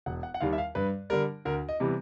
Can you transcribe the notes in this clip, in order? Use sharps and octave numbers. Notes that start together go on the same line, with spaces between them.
E1 F#5
F#5
F#5
D#2 D#3 G3 F5
E5
F5
G2 B4
D3 G3 A#4
D2 A#4
D#5
C3 E3 G3 B3